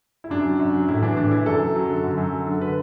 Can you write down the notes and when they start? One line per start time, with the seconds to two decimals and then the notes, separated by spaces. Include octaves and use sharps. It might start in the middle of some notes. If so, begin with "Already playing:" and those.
0.24 E4
0.30 F#2 D4
0.45 F#3
0.59 F#2
0.73 F#3
0.88 A2 E4
1.02 E3 D4
1.17 A2 D4
1.31 E3 E4
1.46 F#2 A4
1.60 F#2
1.75 F#3
1.90 D3
2.04 F#2
2.18 F#2
2.33 F#3
2.47 D3
2.61 B4